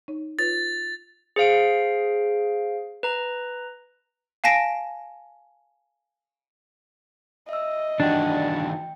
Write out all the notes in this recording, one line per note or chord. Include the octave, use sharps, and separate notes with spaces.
D#4 C#5
F4 B4 C#5 A6
G#4 C5 F5 D7
B4 A#5
F5 G#5 A5 A#6 B6 D7
D#5 E5 E6
D#3 E3 D4 F#4 G4 D5 G5
G5